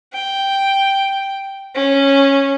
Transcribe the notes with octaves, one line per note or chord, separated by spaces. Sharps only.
G5
C#4